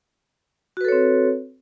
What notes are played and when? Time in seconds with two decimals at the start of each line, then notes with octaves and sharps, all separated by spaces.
0.77 F#4
0.81 B4
0.85 A4
0.88 C#5
0.92 C4